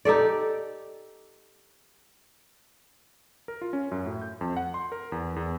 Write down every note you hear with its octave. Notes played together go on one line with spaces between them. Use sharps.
D#4 G4 A4 D5
A#4
F4
C#4
F#2
A2
G6
F2
F#5
C6
A#4
E2
E2